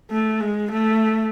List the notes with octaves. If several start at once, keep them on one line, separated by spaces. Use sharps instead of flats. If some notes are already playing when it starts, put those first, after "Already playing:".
A3
G#3
A3